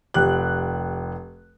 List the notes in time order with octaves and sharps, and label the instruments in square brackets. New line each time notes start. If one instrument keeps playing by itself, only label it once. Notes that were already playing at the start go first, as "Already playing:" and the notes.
[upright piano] F1 G4 F#6